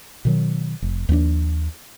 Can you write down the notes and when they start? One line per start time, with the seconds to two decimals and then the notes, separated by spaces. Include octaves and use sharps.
0.25 B2 D#3 F#3
0.82 F1
1.09 D#2 F3 C4 D4